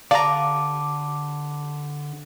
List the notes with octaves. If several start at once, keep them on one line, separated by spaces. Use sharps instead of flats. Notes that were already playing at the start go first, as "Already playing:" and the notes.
D3 G4 D5 F5 A5 A#5 D6